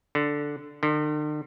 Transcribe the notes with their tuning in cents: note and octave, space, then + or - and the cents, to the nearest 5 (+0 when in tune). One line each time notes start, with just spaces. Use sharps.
D3 -5
D3 +45